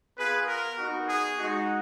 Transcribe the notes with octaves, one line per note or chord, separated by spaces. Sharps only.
B3 F4 G#4 B4
A#4
B3 D#4 F#4
G#4
G#3 D#4 F#4